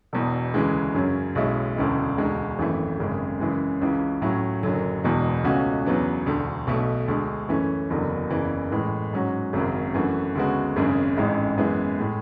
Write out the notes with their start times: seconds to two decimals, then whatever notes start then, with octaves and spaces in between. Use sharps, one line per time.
0.13 E1 E2 B2
0.54 D2 C#3 E3 G#3
0.95 F#2 C#3 F#3 C#4
1.35 B1 B2 G#3 C#4 E4
1.76 E1 D2 C#3 E3 G#3
2.18 E1 D2 D3 G#3
2.59 G#1 F#2 E3 A3
3.00 G#1 F#2 C#3 G#3
3.40 F#2 C#3 E3 G#3
3.81 C#2 C#3 E3
4.22 A2 F#3 C#4 E4
4.63 F#1 F#2 D3 F#3
5.04 E1 E2 B2 G#3
5.44 C#2 B2 A3 C#4 F#4
5.85 E2 C#3 F#3 B3 D4
6.26 E1 D2 D3
6.67 B1 B2 A3
7.08 D2 D3 G#3
7.49 F#2 E3 A3 C#4
7.90 F#1 E2 D3 F#3
8.30 F#1 E2 C#3 E3
8.71 A2 E3 G#3
9.13 G#2 F#3 C#4 F#4
9.53 G#1 F#2 C#3 F#3
9.94 F#2 E3 A3 D4 F#4
10.35 D2 C#3 G#3 B3 F#4
10.76 G#1 F#2 C#3 G#3 D4
11.17 A1 G#2 G#3 C#4 E4
11.57 F#2 E3 G#3 B3 E4
11.99 A2 G#3